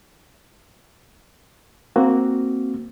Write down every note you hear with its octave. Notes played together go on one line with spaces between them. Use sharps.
A#3 C4 F#4